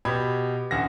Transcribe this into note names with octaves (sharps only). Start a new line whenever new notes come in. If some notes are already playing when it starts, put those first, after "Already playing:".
B2 G4 B5 G#6
A1 D2 F#5 A#6